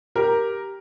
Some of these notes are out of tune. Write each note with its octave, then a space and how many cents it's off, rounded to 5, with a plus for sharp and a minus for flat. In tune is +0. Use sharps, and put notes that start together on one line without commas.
G4 +0 A#4 +0